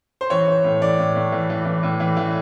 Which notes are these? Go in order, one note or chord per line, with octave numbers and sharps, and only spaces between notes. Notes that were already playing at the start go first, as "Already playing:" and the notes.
C5
E3 C#5
E3
A2
E3 D5
A2
A2
E3
E3
E3
A2
E3
E3